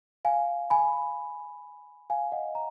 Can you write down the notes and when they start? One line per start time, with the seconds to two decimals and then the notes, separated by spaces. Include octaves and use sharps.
0.25 F5 G#5
0.70 G#5 B5
2.10 F5 G#5
2.32 D#5 F#5
2.55 A#5